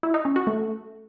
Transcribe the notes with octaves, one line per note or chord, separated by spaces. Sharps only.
E4
D#4
C#4
F#4
A3